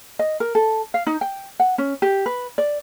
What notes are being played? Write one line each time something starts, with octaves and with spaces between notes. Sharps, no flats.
D#5
A#4
A4
F5
D#4
G5
F#5
C#4
G4
B4
D5